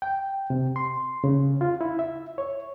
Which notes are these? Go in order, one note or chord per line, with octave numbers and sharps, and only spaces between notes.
G5
C3
C6
C#3
F4
E4
E5
C#5